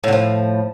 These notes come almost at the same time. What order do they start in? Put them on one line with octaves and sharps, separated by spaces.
A2 D3 F3